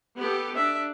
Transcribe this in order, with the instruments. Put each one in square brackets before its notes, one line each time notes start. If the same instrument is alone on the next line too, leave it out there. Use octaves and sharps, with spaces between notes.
[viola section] B3 G4 A4
[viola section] D4 [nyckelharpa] E5